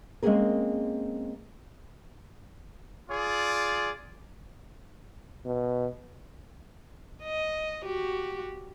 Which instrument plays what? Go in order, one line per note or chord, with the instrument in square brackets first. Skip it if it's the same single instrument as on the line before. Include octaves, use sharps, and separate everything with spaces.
[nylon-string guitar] G#3 A#3 C4 C#4 G#4 A#4
[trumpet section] F4 G#4 D5
[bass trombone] B2
[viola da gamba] D#5
F#4 G4